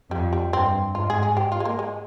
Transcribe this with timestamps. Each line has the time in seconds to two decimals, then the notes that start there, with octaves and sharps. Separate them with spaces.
0.11 F2 G3
0.33 G3
0.53 G2 C4
0.95 G#2 F4
1.10 G#4
1.23 G#4
1.37 G4
1.52 F4
1.60 G#3
1.65 A#3
1.79 G#3